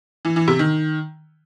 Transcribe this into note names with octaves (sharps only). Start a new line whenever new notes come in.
E3
E3
C3
D#3